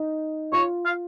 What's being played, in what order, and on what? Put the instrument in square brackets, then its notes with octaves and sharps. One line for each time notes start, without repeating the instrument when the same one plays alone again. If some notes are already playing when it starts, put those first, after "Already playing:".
Already playing: [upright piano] D#4
[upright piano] F4 [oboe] C#5
[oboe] F5